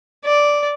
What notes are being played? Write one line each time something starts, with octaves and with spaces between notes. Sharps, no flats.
D5